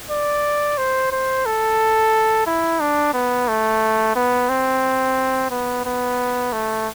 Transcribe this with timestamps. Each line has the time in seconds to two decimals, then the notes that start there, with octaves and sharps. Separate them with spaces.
0.11 D5
0.78 C5
1.12 C5
1.46 A4
2.47 E4
2.81 D4
3.14 B3
3.48 A3
4.16 B3
4.49 C4
5.51 B3
5.85 B3
6.53 A3